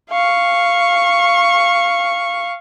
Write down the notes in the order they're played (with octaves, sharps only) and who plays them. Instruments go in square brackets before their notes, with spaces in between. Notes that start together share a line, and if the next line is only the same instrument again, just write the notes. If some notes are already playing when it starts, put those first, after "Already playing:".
[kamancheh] F5 C#6